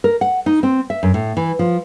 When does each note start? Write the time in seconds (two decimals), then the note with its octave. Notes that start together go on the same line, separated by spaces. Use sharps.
0.04 A#4
0.21 F#5
0.46 D#4
0.63 C4
0.90 E5
1.03 F#2
1.14 A2
1.37 E3
1.59 F3